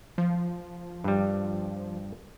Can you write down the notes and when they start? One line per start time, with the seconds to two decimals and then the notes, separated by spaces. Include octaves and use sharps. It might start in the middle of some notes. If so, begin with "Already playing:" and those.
0.18 F3
1.04 G2 G3